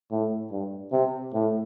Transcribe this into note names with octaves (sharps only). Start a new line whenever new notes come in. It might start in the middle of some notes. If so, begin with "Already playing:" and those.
A2
G2
C3
A2